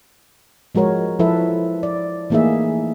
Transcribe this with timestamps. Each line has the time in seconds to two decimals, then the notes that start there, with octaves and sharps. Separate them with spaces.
0.75 F3 G#3 F#4 A#4 C#5
1.19 F3 E4 A4 B4 E5
1.83 D5
2.30 E3 A3 A#3 D#4 G#4 E5